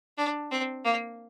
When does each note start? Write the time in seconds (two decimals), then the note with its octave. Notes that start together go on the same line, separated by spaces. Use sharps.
0.18 D4
0.51 C4
0.85 A#3